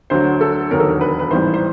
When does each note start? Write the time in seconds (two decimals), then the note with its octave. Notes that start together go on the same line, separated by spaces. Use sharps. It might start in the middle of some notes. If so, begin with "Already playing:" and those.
0.10 D2 D3 F#3 C5
0.41 A4
0.71 E1 D#2 D3 F#3 A#4
0.80 A4
0.89 A#4
1.01 B4
1.19 B4
1.31 A1 G#2 E3 G3 C5
1.54 C5